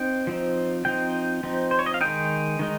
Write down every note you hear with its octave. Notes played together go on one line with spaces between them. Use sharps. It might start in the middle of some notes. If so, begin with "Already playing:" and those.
Already playing: C4 D#4 G5
F3 C4 D#4
F3 C4 D#4 G5
F3 C4 D#4
C5
C#5
D#5
F5
D#3 G#3 D#4 G5
D#3 G#3 D#4